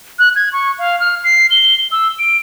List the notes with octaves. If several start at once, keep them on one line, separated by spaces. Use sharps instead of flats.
F#6
G#6
C#6
F5
F6
C7
G7
E6
D7